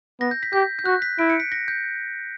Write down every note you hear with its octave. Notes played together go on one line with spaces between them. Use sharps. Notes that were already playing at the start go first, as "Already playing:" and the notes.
B3 A#6
G6
B6
G4 G6
G6
F#4 F#6
B6
E4 D7
C#7
B6
A#6
G6